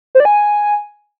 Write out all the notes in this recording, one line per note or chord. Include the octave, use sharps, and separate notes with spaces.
C5
D5
G#5